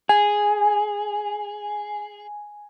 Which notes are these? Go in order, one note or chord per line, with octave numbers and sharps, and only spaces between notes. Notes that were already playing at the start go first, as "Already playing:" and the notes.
G#4 G#5